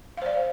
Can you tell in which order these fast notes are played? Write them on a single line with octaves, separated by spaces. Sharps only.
F5 C5 D5